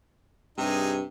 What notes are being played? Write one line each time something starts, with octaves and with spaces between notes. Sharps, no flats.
G2 C3 D#4 G#4